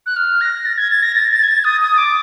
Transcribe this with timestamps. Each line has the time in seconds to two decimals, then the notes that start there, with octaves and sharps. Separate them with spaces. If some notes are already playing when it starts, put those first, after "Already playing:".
0.06 F#6
0.16 F6
0.41 A#6
0.66 A6
0.78 G#6
0.91 A6
1.03 A#6
1.15 A6
1.32 A6
1.43 G#6
1.48 A6
1.64 D#6
1.81 D#6
1.98 D6